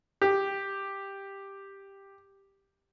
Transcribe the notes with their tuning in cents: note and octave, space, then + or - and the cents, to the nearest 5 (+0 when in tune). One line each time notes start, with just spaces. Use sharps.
G4 +5